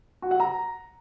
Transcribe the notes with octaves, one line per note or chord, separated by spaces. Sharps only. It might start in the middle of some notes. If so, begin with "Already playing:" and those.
F#4
F#5
A#5